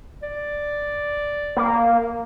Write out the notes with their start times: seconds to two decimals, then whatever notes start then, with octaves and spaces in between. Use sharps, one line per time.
0.23 D5
1.57 A#3